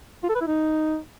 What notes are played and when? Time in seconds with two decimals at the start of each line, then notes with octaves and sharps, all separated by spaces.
0.23 F4
0.29 A4
0.35 B4
0.41 E4
0.47 D#4